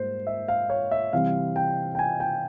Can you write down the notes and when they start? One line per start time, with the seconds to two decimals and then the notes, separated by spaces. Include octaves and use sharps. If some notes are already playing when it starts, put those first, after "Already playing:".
Already playing: G#2 G3 A#3 C5
0.27 E5
0.48 F5
0.70 C#5
0.91 E5
1.13 C3 E3 G3 C4 F5
1.56 G5
1.95 G5
1.99 G#5
2.20 G5